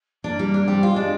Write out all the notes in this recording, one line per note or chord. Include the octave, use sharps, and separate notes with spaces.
A#3 D4
G3
D4
G3 C4
F4
G#3
D4